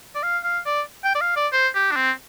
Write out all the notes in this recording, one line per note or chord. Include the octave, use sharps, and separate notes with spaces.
D5
F5
F5
D5
G5
D5
F5
D5
C5
G4
D4
C4